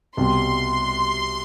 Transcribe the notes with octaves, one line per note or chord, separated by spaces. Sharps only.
C2 B2 G3 C6